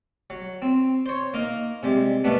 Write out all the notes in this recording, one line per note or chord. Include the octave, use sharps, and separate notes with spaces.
F#3
C4
C5 C#5
A#3 D#4 A#4
C3 G3 G#3
F#2 B2 A3 B3 D4